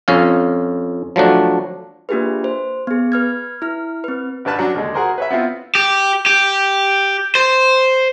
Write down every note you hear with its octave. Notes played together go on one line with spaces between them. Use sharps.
F2 C#4 F5
F3 F#3 A3 D4
A#3 D4 F4 G4 G#4 B4
C5
B3 G#4
B4 F6 G#6
E4 F6
C4 B4
G#1 D4 B4 A5 F#6
F#3 C#4 D4
D#2 D3 G#3
F#4 G#4 A#4 C5
B4 C#5 E5
B3 C4 E4 F4
G4
G4
C5